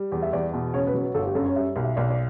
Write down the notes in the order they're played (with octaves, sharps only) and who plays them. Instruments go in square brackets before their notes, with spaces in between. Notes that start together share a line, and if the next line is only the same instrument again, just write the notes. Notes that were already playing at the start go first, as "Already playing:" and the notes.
Already playing: [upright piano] G3
E2
[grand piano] E5
[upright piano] E2 [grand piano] D5
[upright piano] B2
[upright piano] C#3 [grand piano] C#5
[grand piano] B4
[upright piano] F#3
[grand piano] B4
[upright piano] G1 [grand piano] A4
[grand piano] G4
[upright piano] F#2 [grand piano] A4
[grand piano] C#5
[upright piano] G3 [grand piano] E5
[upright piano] B1
[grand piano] E5
[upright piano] B1 [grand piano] D5
[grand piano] D5